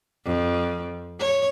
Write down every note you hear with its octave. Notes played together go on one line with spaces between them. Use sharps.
F2
C#5